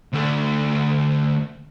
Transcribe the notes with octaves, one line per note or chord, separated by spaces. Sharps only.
D2 A3